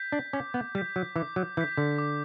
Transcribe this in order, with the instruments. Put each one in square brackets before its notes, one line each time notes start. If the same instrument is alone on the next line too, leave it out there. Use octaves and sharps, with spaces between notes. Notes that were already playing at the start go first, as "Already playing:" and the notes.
Already playing: [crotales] G6 B6
[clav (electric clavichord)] D4
[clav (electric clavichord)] C#4 [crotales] D6
[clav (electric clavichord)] B3
[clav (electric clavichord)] G3 [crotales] G6 B6
[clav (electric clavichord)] F#3
[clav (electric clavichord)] E3 [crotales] D6
[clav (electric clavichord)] F#3
[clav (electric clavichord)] E3 [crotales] G6
[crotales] B6
[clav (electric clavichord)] D3
[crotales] D6